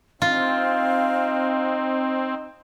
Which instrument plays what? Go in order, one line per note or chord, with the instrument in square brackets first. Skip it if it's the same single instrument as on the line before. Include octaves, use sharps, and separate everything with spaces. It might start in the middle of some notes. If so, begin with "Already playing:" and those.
[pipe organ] C4 [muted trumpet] D#4 [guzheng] F4 [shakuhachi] F5